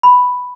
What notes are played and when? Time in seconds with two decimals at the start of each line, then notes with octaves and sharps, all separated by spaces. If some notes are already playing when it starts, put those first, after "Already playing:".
0.03 B5